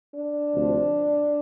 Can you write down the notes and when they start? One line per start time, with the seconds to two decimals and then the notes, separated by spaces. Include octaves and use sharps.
0.14 D4
0.52 D2 C3 F3